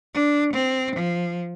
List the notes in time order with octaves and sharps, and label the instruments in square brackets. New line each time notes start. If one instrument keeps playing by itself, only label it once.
[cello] D4
C4
F3